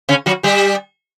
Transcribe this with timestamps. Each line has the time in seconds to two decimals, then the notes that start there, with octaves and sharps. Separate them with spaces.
0.09 C#3 C#4
0.26 F#3 F#4
0.43 G3 G4